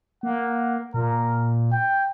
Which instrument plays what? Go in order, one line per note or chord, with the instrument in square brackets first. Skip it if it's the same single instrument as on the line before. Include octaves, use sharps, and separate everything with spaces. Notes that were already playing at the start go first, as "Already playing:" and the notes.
[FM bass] A#3 [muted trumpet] F#5
[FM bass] A#2 [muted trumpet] A#4
[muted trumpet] G5